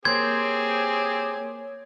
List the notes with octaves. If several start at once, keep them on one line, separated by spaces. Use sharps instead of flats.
A#3 C4 G4 G#4 C5 C#5 C6 G#6